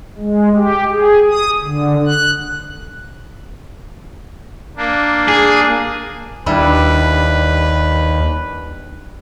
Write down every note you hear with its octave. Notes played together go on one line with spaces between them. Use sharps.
G#3
G4
G#4
D#6
D3
F#6
A#3 D4
G#4
D#2 G3 D4 E4 B4